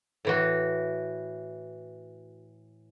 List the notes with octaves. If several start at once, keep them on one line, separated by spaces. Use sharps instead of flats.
A2 E3 F#4